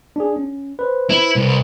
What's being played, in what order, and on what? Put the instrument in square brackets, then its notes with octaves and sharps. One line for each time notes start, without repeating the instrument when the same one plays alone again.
[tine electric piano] D4 G#4
C#4
B4 C5
[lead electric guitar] E4
C2